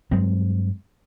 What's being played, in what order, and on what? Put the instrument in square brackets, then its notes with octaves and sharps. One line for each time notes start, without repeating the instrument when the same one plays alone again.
[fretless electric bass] G2 F#3 G#3 C4